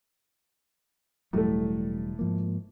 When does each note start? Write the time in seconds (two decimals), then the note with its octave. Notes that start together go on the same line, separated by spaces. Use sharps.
1.33 E1 A2 F#3 G3 A3
2.19 G#2 F3 A#3